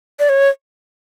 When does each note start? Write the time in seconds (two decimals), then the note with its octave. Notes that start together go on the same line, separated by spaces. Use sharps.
0.19 D5
0.29 C#5